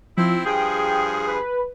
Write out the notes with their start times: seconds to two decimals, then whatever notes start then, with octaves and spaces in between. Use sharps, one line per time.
0.17 F3 C4 E4
0.45 G2 F3 G#4 G5
1.27 B4